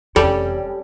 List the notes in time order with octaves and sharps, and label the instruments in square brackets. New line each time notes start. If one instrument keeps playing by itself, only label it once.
[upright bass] F1 E2 [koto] G3 [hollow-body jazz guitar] C#4 G4 A4